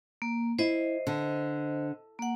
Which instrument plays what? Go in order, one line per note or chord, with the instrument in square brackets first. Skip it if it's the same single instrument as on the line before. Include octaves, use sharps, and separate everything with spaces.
[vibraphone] A#3
[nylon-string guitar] E4 [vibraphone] C5 D#5
[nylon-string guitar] D3
[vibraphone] A#3 F#5